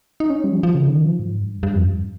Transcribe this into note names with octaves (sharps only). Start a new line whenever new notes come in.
D#4
C#4
G3
F3
F3
C#3
D#3
F3
G#2
G2
G2
F2
G2